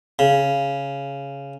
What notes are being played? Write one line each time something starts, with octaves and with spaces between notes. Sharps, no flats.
C#3